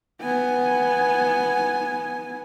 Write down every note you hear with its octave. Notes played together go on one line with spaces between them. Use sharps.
B3 G#5